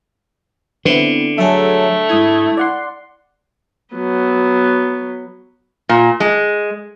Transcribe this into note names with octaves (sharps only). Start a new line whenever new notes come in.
D3 B3 C4 E4
F#3 A3 G#4 A4 E5
G#2 E4 D#6 G#6
D5 F#5 C6
F#3 B3
A#2
G#3